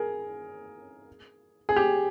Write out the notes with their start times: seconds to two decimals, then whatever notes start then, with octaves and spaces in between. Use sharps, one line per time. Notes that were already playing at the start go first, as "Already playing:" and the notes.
Already playing: G#4 A#4
1.69 G#4
1.76 G4